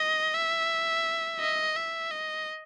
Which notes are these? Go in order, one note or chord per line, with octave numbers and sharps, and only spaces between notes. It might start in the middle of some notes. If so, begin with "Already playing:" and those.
Already playing: D#5
E5
D#5
E5
D#5